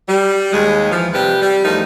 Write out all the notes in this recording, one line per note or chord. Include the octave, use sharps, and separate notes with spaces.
G3
D#2 G#3
E3 F3
C3 F3 G3 G4 B4
G3
E2 F3 A3 D#4 A#4